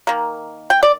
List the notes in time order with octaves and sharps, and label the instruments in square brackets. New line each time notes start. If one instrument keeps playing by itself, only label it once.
[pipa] D#3 A#3
G5
D5